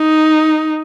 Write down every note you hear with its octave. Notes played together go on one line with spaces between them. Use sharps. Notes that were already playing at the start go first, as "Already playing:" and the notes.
Already playing: D#4